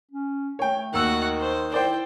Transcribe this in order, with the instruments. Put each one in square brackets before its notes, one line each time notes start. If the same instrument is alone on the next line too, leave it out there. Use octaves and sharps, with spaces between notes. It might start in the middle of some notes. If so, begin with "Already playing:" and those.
[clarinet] C#4
[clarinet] A3 [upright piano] C#5 G5
[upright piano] D#2 E6 [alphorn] D#3 [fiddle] F#4 F#5
[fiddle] C5
[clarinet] E4 [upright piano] C5 D5 [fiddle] G5